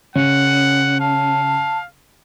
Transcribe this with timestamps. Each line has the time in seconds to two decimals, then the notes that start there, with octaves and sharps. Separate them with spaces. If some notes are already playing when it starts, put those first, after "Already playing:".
0.16 C#3 C#4 F#5
1.00 F5 A5